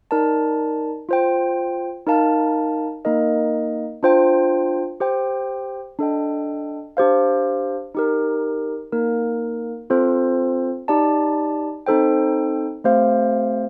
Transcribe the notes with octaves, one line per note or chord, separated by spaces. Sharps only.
D#4 A#4 D5 A5
F4 C5 G5
D#4 A#4 F5 A5
A#3 D#4 A#4 D#5
D4 F4 C5 G5
G4 C5 G5
D4 A4 D#5 G5
D4 G4 C5 F5
D#4 G4 A#4
A#3 D#4 A#4
C4 F4 A4 C5
D#4 G4 D5 A5
C4 D#4 A4 C5 G5
A3 C4 G4 C5 F5